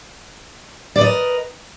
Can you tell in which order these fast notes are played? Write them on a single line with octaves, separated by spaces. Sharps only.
D5 B4 D#5 A#4